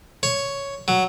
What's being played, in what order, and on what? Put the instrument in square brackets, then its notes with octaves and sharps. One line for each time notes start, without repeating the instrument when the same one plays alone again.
[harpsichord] C#5
F#3